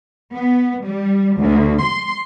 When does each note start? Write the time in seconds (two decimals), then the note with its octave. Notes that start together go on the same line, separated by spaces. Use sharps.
0.33 B3
0.85 G3
1.39 D2
1.82 C6